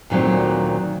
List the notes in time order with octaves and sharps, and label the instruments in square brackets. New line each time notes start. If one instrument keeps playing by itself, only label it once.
[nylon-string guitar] D2 A#2 D#3 F#3 C4